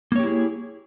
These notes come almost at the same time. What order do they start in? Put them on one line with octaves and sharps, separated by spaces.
A#3 C#5 G4 E4 G#4